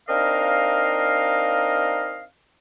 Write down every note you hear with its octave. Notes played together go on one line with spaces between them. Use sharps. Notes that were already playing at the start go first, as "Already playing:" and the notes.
C4 D4 D#4 A#4 D#5 F5